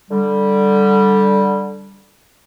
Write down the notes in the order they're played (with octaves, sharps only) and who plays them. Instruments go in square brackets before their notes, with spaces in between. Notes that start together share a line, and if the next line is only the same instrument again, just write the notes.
[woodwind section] D3 G3